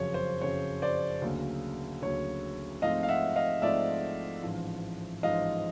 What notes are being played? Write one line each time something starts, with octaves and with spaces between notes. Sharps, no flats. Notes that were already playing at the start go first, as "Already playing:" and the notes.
Already playing: F#1 F2 C#3 F#3 C#5
C5
F#1 F2 C#3 F#3 C#5
C5 D5
D2 C#3 F#3 A#3
D2 C#3 F#3 A#3 C#5
G#2 F3 A3 C4 D#5 F5
F5
E5 F#5
D#5 F5
G#2 F3 A3 C4 D5 E5
A1 G#2 F3
A1 G#2 F3 D#5 F5